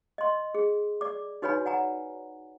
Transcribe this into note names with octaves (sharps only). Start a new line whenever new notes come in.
D#5 C6
G#4
D5 D6
D#4 F#4 B4 C#5 G#5 B5
D5 F#5 G#5 A#5